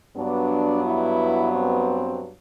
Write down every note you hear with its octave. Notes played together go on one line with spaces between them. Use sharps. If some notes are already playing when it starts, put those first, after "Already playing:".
G2 F#3 B3 D4
E4
C4